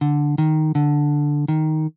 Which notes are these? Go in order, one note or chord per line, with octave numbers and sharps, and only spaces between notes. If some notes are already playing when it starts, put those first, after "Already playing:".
D3
D#3
D3
D#3